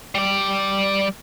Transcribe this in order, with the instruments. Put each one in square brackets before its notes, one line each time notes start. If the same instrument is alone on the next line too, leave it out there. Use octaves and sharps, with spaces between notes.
[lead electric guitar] G3 D5